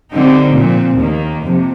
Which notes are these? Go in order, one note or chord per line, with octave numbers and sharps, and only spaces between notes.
D3 G3 C4 D#4
A#2 F3 C4
D#2 D#3 A#3
F2 C3